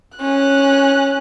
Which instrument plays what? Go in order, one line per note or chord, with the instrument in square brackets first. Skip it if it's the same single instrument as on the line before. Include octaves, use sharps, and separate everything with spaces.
[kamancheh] C#4 F#6